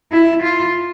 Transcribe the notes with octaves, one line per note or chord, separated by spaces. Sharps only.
E4
F4